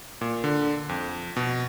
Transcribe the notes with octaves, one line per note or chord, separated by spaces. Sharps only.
A#2
D3
F2
B2